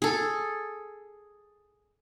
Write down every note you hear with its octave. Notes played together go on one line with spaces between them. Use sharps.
G#4 A4